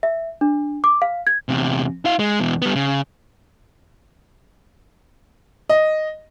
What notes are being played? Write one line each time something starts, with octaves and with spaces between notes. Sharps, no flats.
E5
D4
D6
F5
G#6
E2 C3
E4 F5
G#3
E2 B2
G3 B3
C#3
D#5